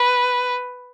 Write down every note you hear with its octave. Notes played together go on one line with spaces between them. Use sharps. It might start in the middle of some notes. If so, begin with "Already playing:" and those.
Already playing: B4